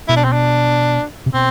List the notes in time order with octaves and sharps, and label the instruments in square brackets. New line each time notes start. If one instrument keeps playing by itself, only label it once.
[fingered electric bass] B2 [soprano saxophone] E4
[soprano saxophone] D4
C4
D4
[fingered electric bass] C3
[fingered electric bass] B2 [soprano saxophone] C4